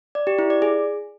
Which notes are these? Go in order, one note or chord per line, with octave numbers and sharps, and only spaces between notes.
D5
G4
E4
D5
G#4